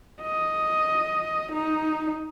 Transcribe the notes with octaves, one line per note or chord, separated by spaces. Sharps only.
D#5
D#4